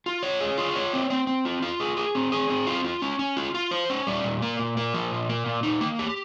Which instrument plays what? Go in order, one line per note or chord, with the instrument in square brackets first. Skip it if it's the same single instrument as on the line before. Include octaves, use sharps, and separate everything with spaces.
[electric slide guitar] F4
C#5
G#4
F4
C#5
C4
C4
C4
F4
F4
G#4
G#4
C4
G#4
C4
F4
F4
C#4
C#4
F4
F4
C5
C#4
G3
A#2
A#3
A#2
A#3
F3
A#2
A#3
A#2
D#4
A#3
G4